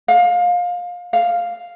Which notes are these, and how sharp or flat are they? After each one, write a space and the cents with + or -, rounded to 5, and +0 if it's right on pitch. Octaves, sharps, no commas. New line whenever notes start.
F5 +25
F5 +0